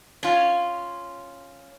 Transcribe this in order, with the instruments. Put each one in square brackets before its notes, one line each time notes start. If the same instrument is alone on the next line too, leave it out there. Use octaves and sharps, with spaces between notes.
[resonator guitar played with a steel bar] C#4 F4